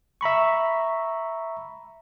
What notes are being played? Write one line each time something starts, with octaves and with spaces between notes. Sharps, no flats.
E5 A#5 B5 C#6